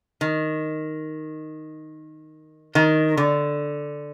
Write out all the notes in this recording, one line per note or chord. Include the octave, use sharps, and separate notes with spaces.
D#3
D#3
D3